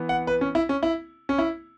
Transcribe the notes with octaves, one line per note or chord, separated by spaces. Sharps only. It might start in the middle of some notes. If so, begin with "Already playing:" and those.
Already playing: E3 B3
F#5
B4
C#4
E4
C#4
E4
C#4
E4